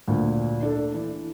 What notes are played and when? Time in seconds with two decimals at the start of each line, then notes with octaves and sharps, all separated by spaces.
0.08 D2 A#2
0.62 D4 A4
0.94 E3